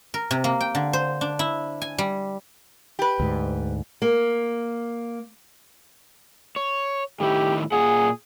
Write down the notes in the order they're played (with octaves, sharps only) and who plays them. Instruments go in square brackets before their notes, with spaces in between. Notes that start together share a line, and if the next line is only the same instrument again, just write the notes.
[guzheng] A#4
C3
A#3
G5
D3
C5
D4
E4
G#5
G3
[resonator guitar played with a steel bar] G4 B4
[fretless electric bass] D2 G#2
[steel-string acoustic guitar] A#3
[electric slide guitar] C#5
[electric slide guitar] A2 D#3 E4 [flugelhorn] G4
[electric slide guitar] A#2 F#5 [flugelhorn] G#4